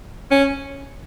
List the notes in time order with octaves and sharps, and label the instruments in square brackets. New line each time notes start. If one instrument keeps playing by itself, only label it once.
[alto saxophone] C#4